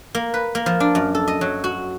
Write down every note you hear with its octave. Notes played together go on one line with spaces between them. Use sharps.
A#3
B4
A#3
F3
D4
F#2
A4
D#5
F#3
F#4